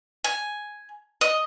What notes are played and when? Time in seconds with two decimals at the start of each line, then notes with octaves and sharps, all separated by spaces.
0.24 G#5
1.21 D#5